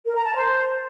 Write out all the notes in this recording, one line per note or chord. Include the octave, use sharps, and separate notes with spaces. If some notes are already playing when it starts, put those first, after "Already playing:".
A#4
A#5
A5
C5